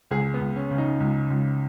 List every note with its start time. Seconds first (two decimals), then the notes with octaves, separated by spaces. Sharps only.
0.11 C#2 G#4
0.34 B3
0.40 C#2
0.56 C#4
0.71 C#3
0.78 D#4
1.00 C#2
1.30 C#2